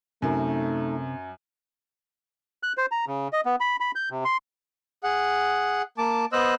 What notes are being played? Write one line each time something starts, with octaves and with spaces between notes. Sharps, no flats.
F#2 C3 A3 D#4 A#4
F#6
C5
A#5
C#3
D#5
B3
B5
B5
G6
C3
C6
G#4 F#5
A#3 A5 D6
B3 C5 D#5 E6 F#6